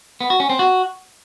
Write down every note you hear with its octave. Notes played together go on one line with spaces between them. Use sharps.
B3
F#4
C#4
C4
F#4